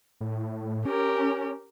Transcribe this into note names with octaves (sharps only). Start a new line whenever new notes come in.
A2
C#4 G4 A#4